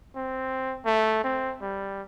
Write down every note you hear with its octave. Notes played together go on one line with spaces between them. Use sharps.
C4
A3
C4
G3